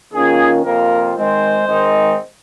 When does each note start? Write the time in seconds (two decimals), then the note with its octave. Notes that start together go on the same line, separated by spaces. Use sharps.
0.12 D#3 A#3 C#4 F4 G#4
0.64 F2 C3 F3 A#3 F4 A#4
1.15 D#3 G#3 C4 C5
1.66 G#2 D#3 G#3 C4 D#4